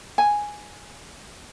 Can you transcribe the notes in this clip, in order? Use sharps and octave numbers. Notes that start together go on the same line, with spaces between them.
G#5